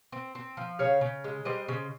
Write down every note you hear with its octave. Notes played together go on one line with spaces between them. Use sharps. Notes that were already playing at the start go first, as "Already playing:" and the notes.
C4
C4
F3
C#3 C#5 F5
C#3
G#3
G3 C5 D#5
C#3